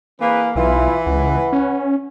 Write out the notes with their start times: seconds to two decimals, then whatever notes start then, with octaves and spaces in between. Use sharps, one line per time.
0.20 E3 A#3 C4 G#4 B4
0.56 B1 E3 E4 F4
1.06 C#2 B4 F#5
1.53 C#4